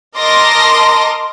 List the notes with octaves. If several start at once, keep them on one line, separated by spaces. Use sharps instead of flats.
A#4 D#5 A5 C6 D6 A#6